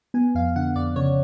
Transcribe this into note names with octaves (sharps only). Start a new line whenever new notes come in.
B3 G#5
F2 F5
D3 F#5
F2 D5
C#3 C#5